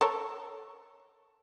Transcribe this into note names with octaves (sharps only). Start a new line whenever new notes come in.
A4 A#4 C#5